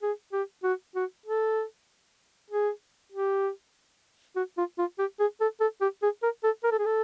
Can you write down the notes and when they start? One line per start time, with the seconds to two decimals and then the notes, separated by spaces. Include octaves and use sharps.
0.02 G#4
0.32 G4
0.64 F#4
0.95 F#4
1.26 A4
2.50 G#4
3.12 G4
4.36 F#4
4.58 F4
4.78 F4
4.99 G4
5.19 G#4
5.41 A4
5.60 A4
5.81 G4
6.02 G#4
6.23 A#4
6.44 A4
6.64 A#4
6.71 A4
6.79 G#4
6.86 A4